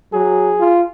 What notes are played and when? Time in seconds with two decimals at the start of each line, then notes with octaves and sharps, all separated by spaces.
0.13 F#3 G#4
0.59 F4